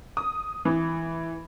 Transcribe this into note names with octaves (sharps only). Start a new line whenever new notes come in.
D#6
E3